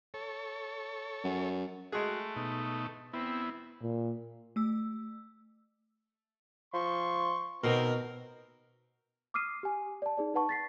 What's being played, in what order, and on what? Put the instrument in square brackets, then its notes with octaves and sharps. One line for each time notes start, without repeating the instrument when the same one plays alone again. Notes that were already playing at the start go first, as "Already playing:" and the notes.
[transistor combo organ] A4 C#5
[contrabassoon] F#2
[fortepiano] G#3 G#4 [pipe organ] A3 [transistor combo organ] F#4
[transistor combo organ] B2 D#4
[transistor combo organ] B3 E4 [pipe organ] C4
[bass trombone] A#2
[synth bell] A3 E6
[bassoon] F3 [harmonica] C6 C#6
[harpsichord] B2 [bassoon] D#3 [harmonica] C4 [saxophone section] A#4
[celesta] D6 D#6 F6 C7 D#7
G4 G#5
D5 A5
D#4 G#4 D5
D#4 B4 F#5 A5 C#6
A6 B6 C7